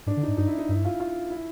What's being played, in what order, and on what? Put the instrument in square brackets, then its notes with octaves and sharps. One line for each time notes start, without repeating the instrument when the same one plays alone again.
[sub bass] G#2 [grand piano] D4
[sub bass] D3
[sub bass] G#2 [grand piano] D#4
[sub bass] G2 [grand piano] D#4
[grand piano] E4
D#4
[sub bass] G2 [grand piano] E4
[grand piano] F4
F4
E4